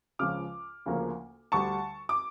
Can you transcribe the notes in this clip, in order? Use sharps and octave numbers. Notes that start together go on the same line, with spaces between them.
C#2 C#3 F3 C#4 D6 F6
D2 C#3 F3 A#3 C#4
D2 D3 G3 A5 C#6
D6